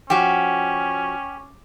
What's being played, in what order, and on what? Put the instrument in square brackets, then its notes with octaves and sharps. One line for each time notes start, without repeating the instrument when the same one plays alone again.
[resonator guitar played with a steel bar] F3 F#4 [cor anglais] C#4 [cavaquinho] G4